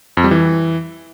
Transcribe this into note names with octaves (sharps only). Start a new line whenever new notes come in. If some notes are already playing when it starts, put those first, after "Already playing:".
F2
G3
E3